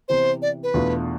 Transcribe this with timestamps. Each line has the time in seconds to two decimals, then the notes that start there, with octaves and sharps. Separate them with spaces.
0.08 C3 E3 B3 C5
0.42 D5
0.63 B4
0.74 E2 B2 A3 D4 F4